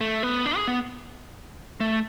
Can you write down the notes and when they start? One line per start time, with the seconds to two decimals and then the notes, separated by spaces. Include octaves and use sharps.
0.01 A3
0.23 B3
0.46 D4
0.56 G#4
0.68 B3
1.80 A3